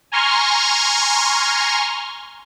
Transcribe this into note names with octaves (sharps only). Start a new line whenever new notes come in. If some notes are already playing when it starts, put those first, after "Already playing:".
G#5 A#5 C6 C#6 F6